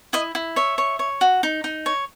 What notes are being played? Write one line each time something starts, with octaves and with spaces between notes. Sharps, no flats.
E4 D#5
E4
C#5 E5
C#5
C#5
F#4
D#4
D#4
C#5